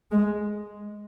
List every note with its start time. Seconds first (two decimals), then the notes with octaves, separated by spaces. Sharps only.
0.11 G#3